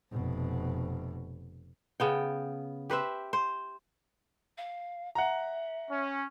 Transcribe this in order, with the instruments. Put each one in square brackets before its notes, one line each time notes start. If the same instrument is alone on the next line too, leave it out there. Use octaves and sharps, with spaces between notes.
[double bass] F1 B2
[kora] C#3 B3 G5
G4 B4 C5 E5
C5
[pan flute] F5
[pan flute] E5 [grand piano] F#5 A#5
[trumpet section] C#4